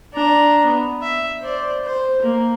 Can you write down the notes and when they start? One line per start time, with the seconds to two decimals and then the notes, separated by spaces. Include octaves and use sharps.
0.14 D4 A#5
0.66 B3
1.02 E5
1.40 C5 D5
1.85 C5
2.22 A#3